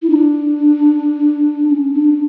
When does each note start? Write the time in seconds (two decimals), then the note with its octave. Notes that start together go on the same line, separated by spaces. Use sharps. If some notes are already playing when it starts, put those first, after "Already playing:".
0.02 E4
0.10 D4
1.67 D4
1.71 C#4
1.93 D4